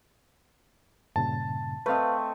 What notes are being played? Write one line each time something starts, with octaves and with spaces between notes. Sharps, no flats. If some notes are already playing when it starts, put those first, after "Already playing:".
G2 A#2 C#3 A5
A3 C4 B4 D#5 F5